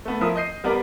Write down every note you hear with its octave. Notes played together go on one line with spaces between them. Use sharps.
A3 B3
F3 E4 A#4 D#6
D#5 G6 C7 D#7
G3 B3 A#4 D5 A#5